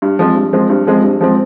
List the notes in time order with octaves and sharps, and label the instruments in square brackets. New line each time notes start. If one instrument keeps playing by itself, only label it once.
[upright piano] G2
F3 G#3 C4
G2
F3 G#3 C4
G2
F3 G#3 C4
G2
F3 G#3 C4